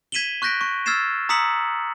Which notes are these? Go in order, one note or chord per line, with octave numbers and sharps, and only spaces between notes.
G#6 B6 D#7 E7 F#7 G7
C#6 F#6 G6 A#6 B6 D7
C#6
E6 F6 G#6 A6 C7 E7
A#5 D#6 E6 B6 C#7 F#7